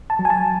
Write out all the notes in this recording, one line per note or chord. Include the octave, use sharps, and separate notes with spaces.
A5
F#3
G#5
A5